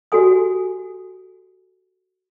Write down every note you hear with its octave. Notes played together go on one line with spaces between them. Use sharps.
F#4 G4 A4 G#5 D#6